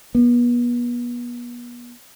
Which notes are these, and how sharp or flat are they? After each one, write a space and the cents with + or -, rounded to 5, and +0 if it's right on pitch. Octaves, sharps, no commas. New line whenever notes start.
B3 -35